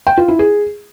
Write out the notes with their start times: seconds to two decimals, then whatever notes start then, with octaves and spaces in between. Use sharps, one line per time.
0.07 G5
0.17 F4
0.28 E4
0.39 G#4